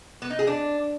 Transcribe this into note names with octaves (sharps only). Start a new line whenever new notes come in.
B3
D#4
G#4
D4